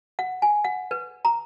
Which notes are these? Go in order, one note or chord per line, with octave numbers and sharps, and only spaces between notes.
F#5
G#5
F#5
B4
A#5